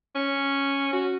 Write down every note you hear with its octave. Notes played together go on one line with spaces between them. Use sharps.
C#4
F#4